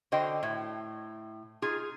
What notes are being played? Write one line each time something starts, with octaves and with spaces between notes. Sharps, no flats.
D3 F#4 C5 D#5 G5
A2
D#4 F4 G#4